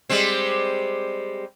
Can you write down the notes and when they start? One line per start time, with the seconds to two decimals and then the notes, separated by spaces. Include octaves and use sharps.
0.09 G3 G#3 C4